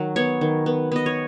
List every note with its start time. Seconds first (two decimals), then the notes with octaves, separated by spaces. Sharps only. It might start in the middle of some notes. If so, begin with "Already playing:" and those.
Already playing: D#3 F#3 F#4
0.16 B3 C#5
0.41 D#3
0.66 B3
0.92 B3 D#5
1.06 C#5